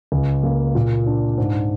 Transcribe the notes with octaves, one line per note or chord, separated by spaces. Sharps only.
C#2
A#3
A#2
D4
G#2